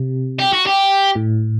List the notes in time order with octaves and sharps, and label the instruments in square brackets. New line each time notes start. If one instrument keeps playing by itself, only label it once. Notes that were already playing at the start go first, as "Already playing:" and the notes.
Already playing: [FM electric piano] C3
[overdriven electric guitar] G4
F#4
G4
[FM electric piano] A2